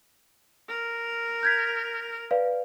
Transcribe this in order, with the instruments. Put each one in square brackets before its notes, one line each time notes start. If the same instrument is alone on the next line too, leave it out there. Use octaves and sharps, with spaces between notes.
[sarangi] A#4
[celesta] G6 G#6 B6
B4 D5 F5